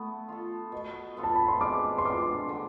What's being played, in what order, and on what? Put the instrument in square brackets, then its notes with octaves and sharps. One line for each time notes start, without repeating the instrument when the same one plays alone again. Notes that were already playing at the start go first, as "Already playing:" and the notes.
Already playing: [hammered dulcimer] A3 B3
F4 A4
B2
B3 F4 A4
[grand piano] A5
B5
C6
[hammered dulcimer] G#3 [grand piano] D6
[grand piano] C6
[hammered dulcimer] D4 F4 [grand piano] D6
[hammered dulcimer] D3